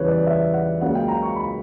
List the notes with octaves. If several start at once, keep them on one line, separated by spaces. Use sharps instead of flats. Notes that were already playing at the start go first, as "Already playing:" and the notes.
Already playing: E2 C#3 E3 G3 B4 C#5
D5
E5
F#5
C#2 C#3 F#3 A#3 C#4 F#5
G5
A#5
C#6
B5